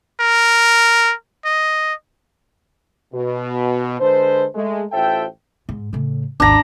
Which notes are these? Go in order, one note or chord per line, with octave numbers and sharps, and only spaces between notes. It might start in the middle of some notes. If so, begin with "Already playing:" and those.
A#4
D#5
B2
D3 G#3 A4 B4 C5
G#3 A3
A1 F4 A4 C5 E5 G5
G#2
A2 C#3
G#1 D#2 D4 A#5